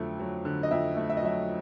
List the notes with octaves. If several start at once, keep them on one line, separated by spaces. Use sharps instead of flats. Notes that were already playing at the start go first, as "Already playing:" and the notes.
Already playing: F2 D3 F#3 A3
F#3
D3
D#5
F2 E5
A3
E5
D#5
F#3 E5